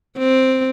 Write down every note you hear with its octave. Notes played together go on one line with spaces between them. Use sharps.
C4